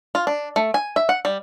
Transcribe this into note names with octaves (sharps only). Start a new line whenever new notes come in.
F4
D4
A3
G#5
E5
F#5
G3